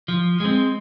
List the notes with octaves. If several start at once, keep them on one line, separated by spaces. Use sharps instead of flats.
F3
G#3 C4